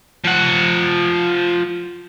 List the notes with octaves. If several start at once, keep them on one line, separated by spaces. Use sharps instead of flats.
F3 F#5